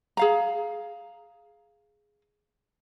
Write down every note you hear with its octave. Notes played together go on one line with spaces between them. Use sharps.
G#4 F5 A#5